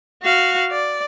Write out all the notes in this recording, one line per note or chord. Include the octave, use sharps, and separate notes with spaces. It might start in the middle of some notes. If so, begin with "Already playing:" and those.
F#4 F5
D5